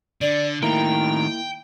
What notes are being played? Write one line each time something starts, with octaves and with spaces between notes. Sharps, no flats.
D3 D5
A2 D#3 A#3 E4 G5 A#5